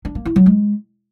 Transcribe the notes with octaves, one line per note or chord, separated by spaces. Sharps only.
D4
A#3
E4
F#3
G#3